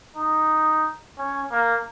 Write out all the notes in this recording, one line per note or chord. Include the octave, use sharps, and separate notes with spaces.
D#4
C#4
A#3